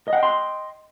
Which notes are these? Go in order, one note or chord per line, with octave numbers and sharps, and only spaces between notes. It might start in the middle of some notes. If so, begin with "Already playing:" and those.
D#5 F#5 G5 C6